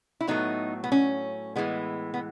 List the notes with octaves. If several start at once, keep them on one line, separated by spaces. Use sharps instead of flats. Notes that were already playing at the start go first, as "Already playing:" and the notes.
E4
A2 F#3 A3 B3 D#4
B3
C#4
A2 E3 G#3 B3
B3